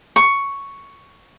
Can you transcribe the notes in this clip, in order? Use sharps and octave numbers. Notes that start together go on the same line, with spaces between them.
C#6